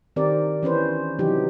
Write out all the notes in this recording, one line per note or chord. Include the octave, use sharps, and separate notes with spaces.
D#3 C4 G4 A#4 D5
E3 C#4 B4 C5
C3 E3 F#3 D#4 G4